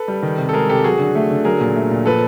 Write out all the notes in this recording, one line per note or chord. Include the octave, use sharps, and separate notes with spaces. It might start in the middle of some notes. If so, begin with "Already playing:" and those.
Already playing: A4 B4
G3
D#3
C3
A4
G#3 G#4 A#4
C3 G4 A4
F#3 F#4 G#4
D3
A3
D3
F#3 G#4 A#4
A#2
A3
A#2
F3 A4 B4